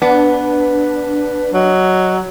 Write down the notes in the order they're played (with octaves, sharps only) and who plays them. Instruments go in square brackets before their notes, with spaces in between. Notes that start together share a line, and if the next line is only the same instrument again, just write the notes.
[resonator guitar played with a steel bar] B3 [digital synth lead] D4 [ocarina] B4
[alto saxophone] F#3 [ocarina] D#5